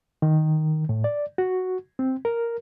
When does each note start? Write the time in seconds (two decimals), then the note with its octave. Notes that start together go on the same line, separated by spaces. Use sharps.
0.22 D#3
0.89 A2
1.04 D5
1.38 F#4
1.99 C4
2.25 A#4